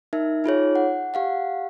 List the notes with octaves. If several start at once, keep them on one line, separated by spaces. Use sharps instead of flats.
D#4 A#4 E5
D#4 F4 G#4 C#5
F#5
G4 F5 F#5